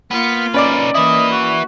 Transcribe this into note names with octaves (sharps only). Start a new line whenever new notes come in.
A#3 B3 F4
C#4 D#4 B4 D5 D6
A#3 E4 B4 D#5
F#4